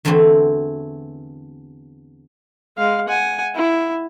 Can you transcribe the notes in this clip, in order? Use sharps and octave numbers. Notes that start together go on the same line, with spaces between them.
E2 D3 E3 A3 C4 F#4
G#3 F5
F#5 G#5
E4